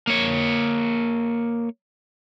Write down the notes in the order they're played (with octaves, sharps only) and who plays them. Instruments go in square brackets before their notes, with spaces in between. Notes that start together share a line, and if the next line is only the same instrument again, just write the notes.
[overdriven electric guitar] A#3 C#5